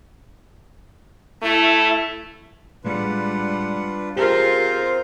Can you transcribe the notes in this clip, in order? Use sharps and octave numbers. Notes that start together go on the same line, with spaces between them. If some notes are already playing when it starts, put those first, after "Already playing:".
A3 E4
A2 G3 G#3 D4 F4 B4 F#5
C4 F4 G4 G#4 A#4 C5